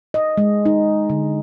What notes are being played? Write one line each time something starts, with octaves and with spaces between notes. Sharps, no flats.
D#5
G#3
D#4
D3